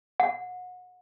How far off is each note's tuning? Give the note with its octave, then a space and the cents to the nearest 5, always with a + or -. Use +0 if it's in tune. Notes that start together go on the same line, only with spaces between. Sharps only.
F#5 -30